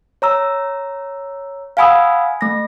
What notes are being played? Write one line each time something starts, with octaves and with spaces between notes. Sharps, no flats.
C#5 A#5 E6
F5 F#5 G#5 B5 D#6 E6
A3 A#6